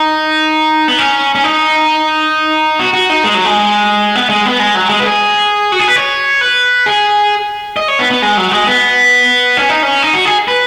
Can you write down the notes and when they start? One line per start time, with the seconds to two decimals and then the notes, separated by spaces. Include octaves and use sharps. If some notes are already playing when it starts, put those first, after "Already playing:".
Already playing: D#4
0.88 B3
0.98 C#4
1.35 C#4
1.44 D#4
2.79 F#4
2.94 F#4
3.10 D#4
3.24 G#3
3.34 F#3
3.45 G#3
4.15 B3
4.30 G#3
4.46 B3
4.60 G#3
4.75 F#3
4.90 G#3
5.00 B4
5.05 G#4
5.72 F#4
5.79 G#4
5.88 B4
5.96 C#5
6.41 B4
6.86 G#4
7.77 D#5
7.88 C#5
7.99 B3
8.11 B3
8.22 G#3
8.37 F#3
8.51 G#3
8.67 B3
9.57 C#4
9.69 D#4
9.83 C#4
10.02 D#4
10.14 F#4
10.25 G#4
10.48 B4